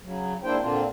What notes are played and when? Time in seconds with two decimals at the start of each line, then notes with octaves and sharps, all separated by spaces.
0.03 C#3 F#3
0.43 G#2 A#3 D4 E4 C5 G5
0.61 A#2 D3 A#3 C4 D4 F4